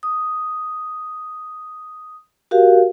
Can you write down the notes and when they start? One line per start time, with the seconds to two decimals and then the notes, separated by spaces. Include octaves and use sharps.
0.03 D#6
2.51 F#4 G4 A#4 F5